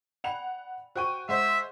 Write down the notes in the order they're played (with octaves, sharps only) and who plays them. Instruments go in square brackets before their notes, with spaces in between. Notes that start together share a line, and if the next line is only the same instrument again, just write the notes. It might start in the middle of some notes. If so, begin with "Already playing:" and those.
[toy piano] D5 G5 B5 [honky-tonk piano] F#5 F7
[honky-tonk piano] F#4 G5 D#7 [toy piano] C5 C#6
[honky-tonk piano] G#3 C5 [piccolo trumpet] E5 [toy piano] F#5